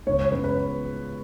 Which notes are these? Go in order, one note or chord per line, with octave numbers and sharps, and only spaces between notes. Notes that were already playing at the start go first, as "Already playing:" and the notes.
C#2 C#5
C#5
C#3 G#3 B3 B4
B4